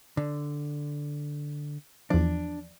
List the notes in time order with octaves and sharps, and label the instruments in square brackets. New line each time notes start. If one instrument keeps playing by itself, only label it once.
[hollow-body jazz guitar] D3
[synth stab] E2 F3 [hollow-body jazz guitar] D4